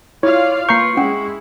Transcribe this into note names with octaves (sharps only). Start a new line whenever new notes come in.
E4 F4 C#5 D5 F5
A#3 F4 B4 A#5 C#6 G6 C7
G#3 C#4 E4 F#5 G5